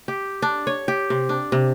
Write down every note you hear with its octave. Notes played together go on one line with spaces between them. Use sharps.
G4
D4
C#5
G4
C3
D4
C3